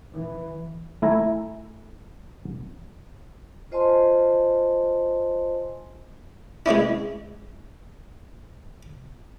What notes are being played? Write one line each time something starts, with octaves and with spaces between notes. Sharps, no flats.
E3
A3 E4 G#5 A#5
F4 C5 D#5 G#5 A5 C6
G#3 C4 C#4 E4